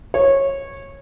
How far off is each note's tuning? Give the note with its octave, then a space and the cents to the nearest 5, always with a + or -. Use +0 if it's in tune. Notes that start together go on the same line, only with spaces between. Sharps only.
C#5 -15